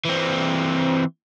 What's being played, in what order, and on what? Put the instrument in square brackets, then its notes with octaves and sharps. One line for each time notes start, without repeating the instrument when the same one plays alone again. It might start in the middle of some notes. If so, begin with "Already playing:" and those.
[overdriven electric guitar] E3 C4